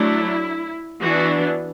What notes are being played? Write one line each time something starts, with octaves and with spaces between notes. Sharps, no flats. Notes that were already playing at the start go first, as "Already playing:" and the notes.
Already playing: F#3 A3 D4 E4
E3 B3 D4 F#4